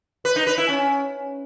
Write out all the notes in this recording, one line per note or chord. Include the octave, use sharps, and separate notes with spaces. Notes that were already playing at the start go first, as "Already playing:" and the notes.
B4
D#4
B4
E4
C#4